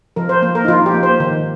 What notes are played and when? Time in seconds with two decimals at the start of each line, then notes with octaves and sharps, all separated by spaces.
0.16 F3 A#4
0.29 C5
0.42 A#3
0.55 A#4
0.64 D#4
0.68 F3 F4
0.86 G4
0.94 A#3
1.03 C5
1.20 D#3